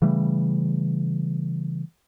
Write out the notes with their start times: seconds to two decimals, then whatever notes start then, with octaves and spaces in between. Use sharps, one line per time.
0.02 C#3 E3 G3 A3